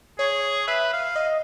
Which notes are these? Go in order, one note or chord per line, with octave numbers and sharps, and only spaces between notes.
G#4 C#5
B4 E5
F5
D#5